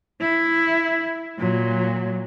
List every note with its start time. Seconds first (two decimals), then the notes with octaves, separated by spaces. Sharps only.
0.20 E4
1.39 A#2 F#3